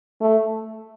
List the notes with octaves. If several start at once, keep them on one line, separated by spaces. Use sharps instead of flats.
A3